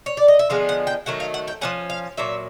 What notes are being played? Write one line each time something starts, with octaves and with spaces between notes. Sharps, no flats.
C#5
D5
D#5
E5
D3 F3 G#3 B3 F5
F#5
G5
D#3 F#3 A3 F#5
F5
F#5
G5
F3 A#3 C#4 F#5
F5
A#2 F#3 E5